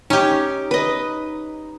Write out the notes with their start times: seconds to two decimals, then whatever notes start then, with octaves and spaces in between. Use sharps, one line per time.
0.10 C#4 D#4 G4
0.71 B4 D#5